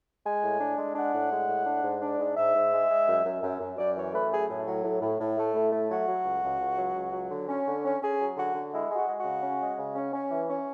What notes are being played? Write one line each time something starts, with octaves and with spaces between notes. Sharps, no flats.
G#3 G#5
A2
D4
G#3
D4 F#5
A2
G#3
A2
D4
G#2
D4
G#2
G#2 E5
G#2
G#3
G#3
F#2
F#2
F#2
F#2
F#2 D5
E3 C#5
A3 B4
F#2 G#4
A2
F#3
A2
A2
A2
A3
A2
A3
F#3 F#4
F#3
C#2
C#2
C#2
F#3
C#2
F#3
D3
C#4
D3
C#4
C#4 G#4
F#3
D3 F#4
D3
G#3 E4
G#3
F#4
G#3
F#4
C#3
C#4
G#3
C#3
C#4
C#4
E3
C#4